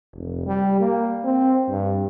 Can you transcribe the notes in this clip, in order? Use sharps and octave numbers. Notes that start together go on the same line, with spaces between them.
F1
G3
A#3
C4
G2